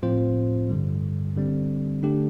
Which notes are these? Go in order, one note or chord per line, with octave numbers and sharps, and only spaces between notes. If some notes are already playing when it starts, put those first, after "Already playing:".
A2 F3 C4 F4 C5
G2 D3 G3
D3 G3 C4
D3 A3 D4 G4